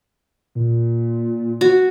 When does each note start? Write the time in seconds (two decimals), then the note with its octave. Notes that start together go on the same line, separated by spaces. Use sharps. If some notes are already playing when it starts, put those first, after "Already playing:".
0.55 A#2
1.61 F#4